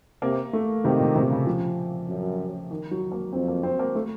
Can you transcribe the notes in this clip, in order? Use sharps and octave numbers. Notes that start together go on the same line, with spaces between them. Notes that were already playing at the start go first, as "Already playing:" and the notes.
C3 A#3
A3
C3 D#3
A#2
C3
C#3
F3
F#2
D#3
F#3
A#3
F2 C4
A#3
C4
A#3
A3